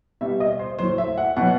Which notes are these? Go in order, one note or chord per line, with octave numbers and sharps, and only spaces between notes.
B2 G3 E5
D#5
C5
A2 F#3 C5
E5
F#5
B2 F#3 F#5